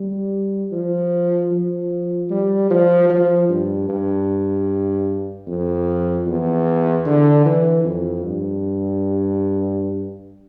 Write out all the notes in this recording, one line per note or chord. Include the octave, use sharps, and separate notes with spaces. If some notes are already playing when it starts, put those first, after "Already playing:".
Already playing: G3
F3
F3
G3
F3
F3
G2
G2
F2
E2
D3
E3
F2
G2